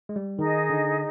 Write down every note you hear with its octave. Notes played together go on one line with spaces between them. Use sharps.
G#3
G3
D#3 D#4 G#4 D#5
D3